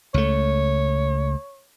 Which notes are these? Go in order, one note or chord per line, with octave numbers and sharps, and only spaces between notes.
C#2 A3 C#5